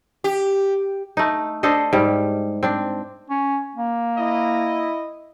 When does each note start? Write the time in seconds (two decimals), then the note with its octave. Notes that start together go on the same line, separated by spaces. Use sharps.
0.24 G4
1.17 A3 D#4
1.63 D4 A4 C5 D#5
1.93 G#2 G3
2.63 C4 D4
3.30 C#4
3.75 A#3
4.18 E4 D#5